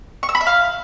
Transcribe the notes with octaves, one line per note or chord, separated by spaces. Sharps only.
C#6
E6
B5
E5
F5